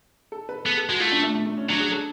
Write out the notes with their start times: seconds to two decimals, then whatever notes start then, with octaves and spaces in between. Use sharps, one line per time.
0.32 A4
0.49 B4
0.66 B3 A4
0.77 A4
0.89 G#3 F#4
1.00 A3 F4
1.12 D4
1.23 A3
1.34 A3
1.46 A3
1.57 C#4
1.69 F#3 D4
1.80 G#4
1.92 A4